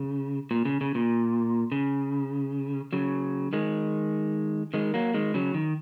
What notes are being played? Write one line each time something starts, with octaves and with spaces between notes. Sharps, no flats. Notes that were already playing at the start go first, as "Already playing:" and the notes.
Already playing: C#3
A#2
C#3
C#3
A#2
C#3
C#3 F#3
D#3 G#3
D#3 G#3
F#3 A#3
D#3 G#3
C#3 F#3
D#3